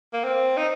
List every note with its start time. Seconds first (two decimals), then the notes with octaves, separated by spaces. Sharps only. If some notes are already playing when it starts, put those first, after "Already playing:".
0.13 A#3
0.24 C4
0.57 D#4